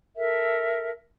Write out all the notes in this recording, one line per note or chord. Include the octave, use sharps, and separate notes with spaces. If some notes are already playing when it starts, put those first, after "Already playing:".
A4 A#4 E5